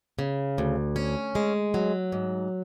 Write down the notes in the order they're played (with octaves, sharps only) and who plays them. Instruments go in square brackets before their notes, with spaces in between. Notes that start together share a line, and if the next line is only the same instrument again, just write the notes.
[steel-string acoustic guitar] C#3
D2
C#4
G#3
F#3
G#2